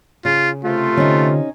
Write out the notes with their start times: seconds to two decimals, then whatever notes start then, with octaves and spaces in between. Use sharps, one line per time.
0.25 C#3 F4
0.64 C3 A3 F4
0.97 D3 C#4 D#4